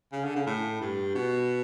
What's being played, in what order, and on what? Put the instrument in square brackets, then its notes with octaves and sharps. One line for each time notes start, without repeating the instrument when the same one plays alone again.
[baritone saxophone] C#3
D3
C#3
A2
G2
B2